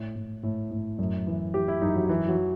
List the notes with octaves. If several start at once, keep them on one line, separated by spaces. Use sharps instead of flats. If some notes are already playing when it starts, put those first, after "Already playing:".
Already playing: A2
A2
A2
A2
F#2
E3
E3 G4
E4
F#2 D#4
F#3
E3
F#3
E3